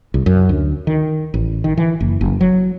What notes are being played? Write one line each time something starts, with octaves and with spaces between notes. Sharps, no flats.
C2
F#2
D2
D#3
A1
D#3
E3
F#1
F#1
F#3